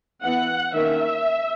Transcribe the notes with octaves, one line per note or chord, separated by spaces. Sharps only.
E3 B3 F#5
D#3 A#3 C#4 E5